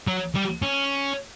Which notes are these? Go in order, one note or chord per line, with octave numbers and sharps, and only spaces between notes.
F#3
G3
C#4